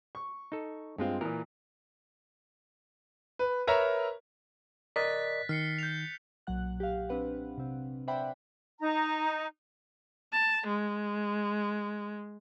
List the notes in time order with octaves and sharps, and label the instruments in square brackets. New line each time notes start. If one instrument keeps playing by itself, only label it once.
[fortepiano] C#6
[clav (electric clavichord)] D#4 A4
[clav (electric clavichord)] G2 [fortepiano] G#3 C4 F4
[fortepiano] A#2 E3 [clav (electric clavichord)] A#4
[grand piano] B4
A#4 B4 C#5 E5 A#5
[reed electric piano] A#4 D5 D#5 [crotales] F#6 A6 B6
[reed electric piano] D#3 [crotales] F6 C7 C#7
[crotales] G6 F7
[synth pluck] B1 A#2 F#3 F#5 F#6
G4 F5
C4 D4 B4 F#5
C3 C4
C5 D5 E5 F#5 G5 B5
[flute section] D#4 A#5
[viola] A5
G#3